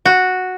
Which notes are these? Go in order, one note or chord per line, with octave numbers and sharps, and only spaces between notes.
F#4